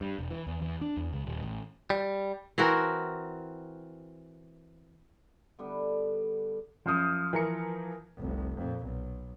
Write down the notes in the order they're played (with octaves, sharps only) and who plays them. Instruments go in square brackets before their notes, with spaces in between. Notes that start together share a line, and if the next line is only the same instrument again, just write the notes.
[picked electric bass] G2
E1
E3
E2
E2
D4
E2
C#2
D#1
A1
[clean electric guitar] G3
[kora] E3 C4 F#4 A#4
[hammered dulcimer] D3 G3 B3
[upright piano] F#2 D#6 [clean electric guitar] F3
[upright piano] E3 A#4 C#7
[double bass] F1 C2
F2 A#2
B1